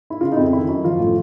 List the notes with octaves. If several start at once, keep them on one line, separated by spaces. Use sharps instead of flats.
E4
C#3 F4
D#4
F2 E4
D#3 E4
F#2
F3 F4
A2